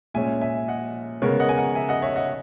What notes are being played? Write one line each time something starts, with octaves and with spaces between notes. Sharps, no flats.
A#2 G#3 C#4 E5 G#5
E5 G#5
D#5 F#5
C#3 G#3 B3 A#4 C#5
D#5 F#5
G#5
F#5 A#5
E5 G#5
D#5 F#5
C#5 E5
D#5 F#5